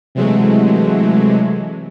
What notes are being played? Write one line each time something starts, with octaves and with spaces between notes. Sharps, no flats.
C3 E3 F#3 G#3 A3